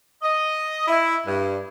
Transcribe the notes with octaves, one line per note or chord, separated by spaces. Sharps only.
D#5
E4
G2